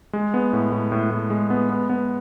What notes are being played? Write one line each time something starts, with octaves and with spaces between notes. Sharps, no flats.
G#3
B3
A2
A2
A2
A2
G#3
B3
B3
B3